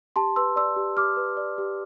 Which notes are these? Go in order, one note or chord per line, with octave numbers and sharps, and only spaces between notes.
G4 A5 C6
B4 C6 E6
D5 C6 E6
G4
G4 D6 F6
B4
D5
G4